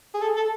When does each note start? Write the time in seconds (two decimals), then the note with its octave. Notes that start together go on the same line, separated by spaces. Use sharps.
0.14 G#4
0.22 A4
0.37 A4